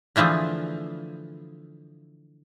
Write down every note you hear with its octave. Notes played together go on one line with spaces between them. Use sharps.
D3 E3 F3 A3 G#4